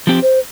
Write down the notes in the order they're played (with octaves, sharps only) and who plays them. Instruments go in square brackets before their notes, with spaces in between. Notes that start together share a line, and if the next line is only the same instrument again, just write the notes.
[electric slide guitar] F3 C4 G4
[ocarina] C5